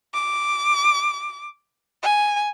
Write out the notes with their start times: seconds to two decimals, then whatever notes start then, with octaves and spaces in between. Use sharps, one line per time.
0.14 D6
2.03 G#5